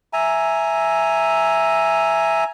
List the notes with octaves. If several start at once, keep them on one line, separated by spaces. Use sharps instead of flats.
E5 G#5 A#5